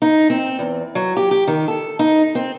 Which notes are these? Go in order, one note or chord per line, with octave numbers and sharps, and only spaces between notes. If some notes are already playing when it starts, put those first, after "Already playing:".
D#4
C4
E2
F#3
G4
G4
D#3
A4
D#4
C4